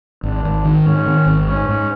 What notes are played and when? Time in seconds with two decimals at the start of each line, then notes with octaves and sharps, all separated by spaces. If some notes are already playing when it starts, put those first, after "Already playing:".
0.23 G#1 D4
0.45 G#1
0.64 D#3
0.85 G#2 C#4
1.07 D#3
1.26 G#1
1.47 G#2 C#4
1.69 G#2